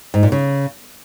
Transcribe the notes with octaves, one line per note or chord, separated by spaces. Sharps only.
G#2
A#2
C#3